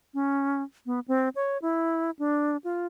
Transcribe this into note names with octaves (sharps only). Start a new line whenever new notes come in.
C#4
B3
C4
C#5
E4
D4
F4